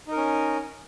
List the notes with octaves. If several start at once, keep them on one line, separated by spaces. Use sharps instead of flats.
C#4 D#4 A#4